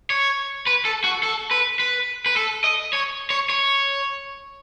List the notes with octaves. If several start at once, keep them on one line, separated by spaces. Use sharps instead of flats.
C#5
B4
A4
F#4
A4
B4
B4
B4
A4
D#5
C#5
C#5
C#5